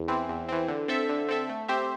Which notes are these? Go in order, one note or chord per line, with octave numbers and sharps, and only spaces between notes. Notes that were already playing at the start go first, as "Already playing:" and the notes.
Already playing: E2
E3 C4
E2
E3 C4
D3
C4 A4 E5
D3
C4 A4 E5
A3
C4 G4 C5 E5